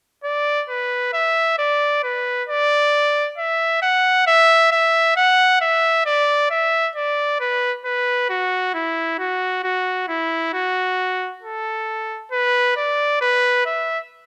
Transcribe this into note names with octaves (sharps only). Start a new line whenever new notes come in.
D5
B4
E5
D5
B4
D5
E5
F#5
E5
E5
F#5
E5
D5
E5
D5
B4
B4
F#4
E4
F#4
F#4
E4
F#4
A4
B4
D5
B4
E5